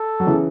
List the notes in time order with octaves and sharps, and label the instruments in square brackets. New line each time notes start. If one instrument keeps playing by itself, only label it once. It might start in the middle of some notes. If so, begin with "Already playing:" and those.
Already playing: [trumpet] A4
[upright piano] F#3
C#3 E3